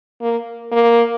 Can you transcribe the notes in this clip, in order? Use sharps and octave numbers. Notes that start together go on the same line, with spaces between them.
A#3
A#3